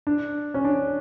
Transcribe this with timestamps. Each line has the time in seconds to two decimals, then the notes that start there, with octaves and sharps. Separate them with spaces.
0.07 D4
0.54 C#4
0.65 D4